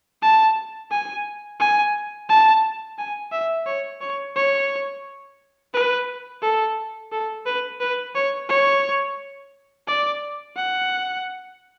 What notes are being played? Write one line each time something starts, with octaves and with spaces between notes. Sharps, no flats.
A5
G#5
G#5
A5
G#5
E5
C#5
C#5
C#5
B4
A4
A4
B4
B4
C#5
C#5
D5
F#5